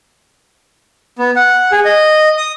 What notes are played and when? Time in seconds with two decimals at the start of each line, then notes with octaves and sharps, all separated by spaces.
1.19 B3
1.36 F#5
1.72 G#4
1.85 D#5
2.37 D#6